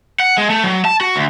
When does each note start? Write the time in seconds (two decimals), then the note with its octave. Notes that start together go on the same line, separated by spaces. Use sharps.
0.20 F#5
0.38 G#3
0.50 A3
0.64 F#3
0.85 A5
1.01 F#4
1.16 D2